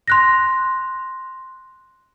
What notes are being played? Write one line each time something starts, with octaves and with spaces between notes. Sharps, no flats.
C6 F#6 A#6